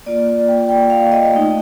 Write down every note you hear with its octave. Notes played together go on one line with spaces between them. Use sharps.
A#3 F4 D5
G5
G5
F5
D#5
A3 D#4